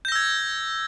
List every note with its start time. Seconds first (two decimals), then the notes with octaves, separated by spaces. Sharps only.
0.05 G6
0.08 A#6
0.12 E6
0.16 G#6